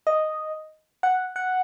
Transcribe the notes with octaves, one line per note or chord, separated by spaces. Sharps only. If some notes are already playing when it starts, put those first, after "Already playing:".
D#5
F#5
F#5